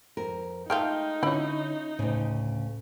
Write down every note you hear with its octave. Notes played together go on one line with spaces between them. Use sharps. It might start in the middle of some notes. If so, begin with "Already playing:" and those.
F2 A#4
G#3 A3 D#4 F4 G5 C6 F6 G6
D3 C#4 E4 F4 C#5 B5
D2 A2 C#3